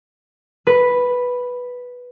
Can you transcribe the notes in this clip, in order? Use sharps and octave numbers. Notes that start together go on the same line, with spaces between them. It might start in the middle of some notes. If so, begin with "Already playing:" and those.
B4